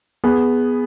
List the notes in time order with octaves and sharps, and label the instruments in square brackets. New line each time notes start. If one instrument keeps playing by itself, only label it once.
[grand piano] B3 G#4